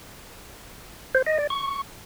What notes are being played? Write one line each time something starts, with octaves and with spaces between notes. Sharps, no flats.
C5
D#5
D5
C#6